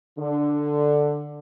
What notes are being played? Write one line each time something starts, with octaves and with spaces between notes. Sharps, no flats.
D3